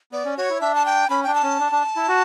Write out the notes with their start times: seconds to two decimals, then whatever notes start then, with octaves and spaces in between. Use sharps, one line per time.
0.12 B3 D5
0.25 C#4
0.37 F#4 C#5
0.50 E4
0.61 D4 E5
0.75 A5
0.86 G5
1.10 C#4 B5
1.23 D4 G5
1.35 A5
1.43 C#4
1.60 D4
1.72 D4
1.96 E4
2.08 F#4